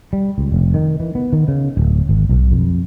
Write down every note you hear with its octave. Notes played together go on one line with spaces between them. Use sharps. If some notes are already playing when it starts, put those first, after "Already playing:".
G3
C#2
F1
D#3
E3
B3
D#3
C#3
D1
G#1
B1
F2